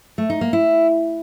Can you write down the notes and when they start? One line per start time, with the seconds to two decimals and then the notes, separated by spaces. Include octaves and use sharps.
0.18 A3
0.30 D#4
0.41 A#3
0.53 E4